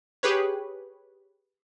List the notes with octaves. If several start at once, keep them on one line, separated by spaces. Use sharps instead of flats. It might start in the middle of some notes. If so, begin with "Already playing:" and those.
G4 G#4 B4 C#5